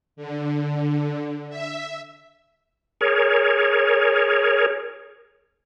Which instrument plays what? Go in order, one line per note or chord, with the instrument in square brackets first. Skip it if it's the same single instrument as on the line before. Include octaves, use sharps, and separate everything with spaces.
[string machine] D3
E5
[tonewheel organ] G#4 A#4 C#5